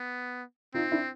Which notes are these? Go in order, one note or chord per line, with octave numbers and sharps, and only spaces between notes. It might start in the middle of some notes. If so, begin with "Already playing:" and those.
Already playing: B3
C4 D#4 F4
D4 E4